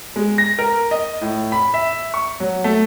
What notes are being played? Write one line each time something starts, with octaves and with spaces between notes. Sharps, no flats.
G#3
A#6
A#4
D#5
A2
B5
E5
C#6
F#3
A3